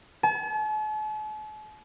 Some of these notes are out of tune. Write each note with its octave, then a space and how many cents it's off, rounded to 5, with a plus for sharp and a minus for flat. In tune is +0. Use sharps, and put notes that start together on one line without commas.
A5 -45